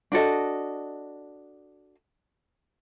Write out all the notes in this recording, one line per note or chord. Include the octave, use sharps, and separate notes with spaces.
D4 F#4 A4 D#5